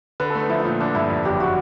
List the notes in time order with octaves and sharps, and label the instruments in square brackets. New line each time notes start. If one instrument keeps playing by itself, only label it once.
[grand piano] D3 [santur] B4
[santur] A4
[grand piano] A3
[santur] D#4
[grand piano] F3 [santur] E4
[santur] D#4
[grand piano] A#2
[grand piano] D3 [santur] D4
[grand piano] G2 [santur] E4
[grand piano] F2
[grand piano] F#1 [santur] G4
[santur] F#4